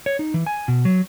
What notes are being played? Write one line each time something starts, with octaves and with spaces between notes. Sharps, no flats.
C#5
D#4
E3
G#5
B2
F#3